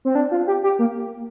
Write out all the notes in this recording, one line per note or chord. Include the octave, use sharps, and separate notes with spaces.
C4
D4
F4
G4
G4
A#3